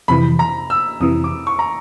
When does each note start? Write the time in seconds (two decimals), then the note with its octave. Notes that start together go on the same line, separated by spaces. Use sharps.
0.08 F2 C3 E3 B5
0.39 A#5
0.70 E6
1.01 F2 C3 E3 D#6
1.24 D6
1.47 C#6
1.59 A#5